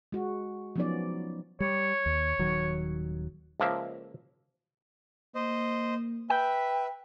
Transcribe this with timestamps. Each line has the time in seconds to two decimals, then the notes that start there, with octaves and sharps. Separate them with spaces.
0.12 G#3 F#4
0.76 F3 F#3 B3 C#4 D#4 D5
1.60 G3 C#5
2.06 D#2
2.39 D#1 D#3 F#3
3.60 C#2 F3 A#3 E5
5.35 A#3 C5 D#5
6.30 B4 E5 G5